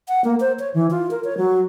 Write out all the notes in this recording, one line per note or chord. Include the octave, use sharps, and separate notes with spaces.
F#5
A#3
C5
C#5
E3
F4
A#4
C#5
F#3